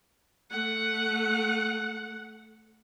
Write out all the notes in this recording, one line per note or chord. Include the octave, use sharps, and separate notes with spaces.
A3 F#5